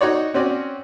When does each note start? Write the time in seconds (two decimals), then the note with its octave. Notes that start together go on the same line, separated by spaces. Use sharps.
0.01 D#4 F#4 C#5 D5
0.34 C4 C#4 F#4 D5